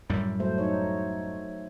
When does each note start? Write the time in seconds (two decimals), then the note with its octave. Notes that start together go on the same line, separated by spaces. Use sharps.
0.10 F#2 A2 G3
0.40 F#3 A3 C5
0.58 D#4 C#5